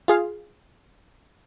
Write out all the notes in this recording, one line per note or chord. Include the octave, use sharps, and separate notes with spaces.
F4 G#4 F5